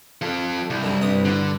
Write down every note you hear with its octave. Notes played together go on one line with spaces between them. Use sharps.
F3 A4
C2
F#2 D3 G3
G2 D#6
D3